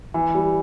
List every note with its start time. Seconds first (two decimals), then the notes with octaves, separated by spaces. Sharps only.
0.14 E3
0.35 G3